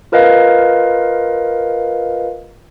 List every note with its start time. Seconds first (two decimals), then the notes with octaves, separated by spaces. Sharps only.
0.12 F4 A#4 B4 D#5 F5